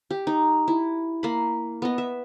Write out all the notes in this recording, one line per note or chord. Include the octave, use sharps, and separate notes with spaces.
G4
D#4
E4
A#3 B5
B3 D#5
E5